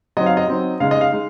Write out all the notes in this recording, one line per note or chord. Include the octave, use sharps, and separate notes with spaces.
F#3 C4 D#4 D#5
F5
D#5
F#3 C4 D#4
C#3 G#3 D#4 F5
D#5
F5
G#3 D#4